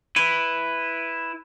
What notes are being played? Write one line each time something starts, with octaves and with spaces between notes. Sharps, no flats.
E4 B4